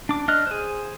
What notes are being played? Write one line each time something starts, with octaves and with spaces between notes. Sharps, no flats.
D4 D6
D4 D#5 F6 F#6
G#4 C5